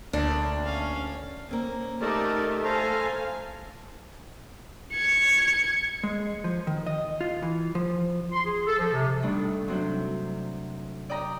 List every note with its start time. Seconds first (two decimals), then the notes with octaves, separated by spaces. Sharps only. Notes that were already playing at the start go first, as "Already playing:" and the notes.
0.13 D2 A#3 D4
0.65 C#4 F5
1.49 A#3 C4 C#4
2.01 A3 D#4 G4 A#4 D5
2.64 A4 C5 F5 G#5 A#5
4.94 G#6 C#7
6.03 G#3
6.44 F3
6.67 D#3
6.86 D#5
7.21 F4
7.42 E3
7.75 F3
8.32 C6
8.45 G#4
8.66 A4
8.79 F3
8.93 C3
9.22 G2 D#3 A3 D4
9.68 C3 F#3 D4 G6
11.10 D5 D#5 G5 A#5